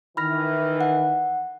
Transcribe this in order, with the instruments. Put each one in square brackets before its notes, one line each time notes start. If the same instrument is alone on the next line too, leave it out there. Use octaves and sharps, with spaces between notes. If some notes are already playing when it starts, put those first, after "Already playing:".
[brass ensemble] D#3 E3 [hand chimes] B5 F6 A#6
[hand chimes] F#5